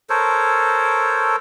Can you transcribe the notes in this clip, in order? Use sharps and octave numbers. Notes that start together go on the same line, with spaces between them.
A4 A#4 C5 C#5